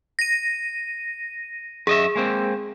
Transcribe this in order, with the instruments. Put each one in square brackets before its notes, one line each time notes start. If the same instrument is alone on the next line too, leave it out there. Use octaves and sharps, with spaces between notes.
[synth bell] A#6 D#7
[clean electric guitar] F#2 D#5 E5 [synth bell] G#4
[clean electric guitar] G#3 A#3 C4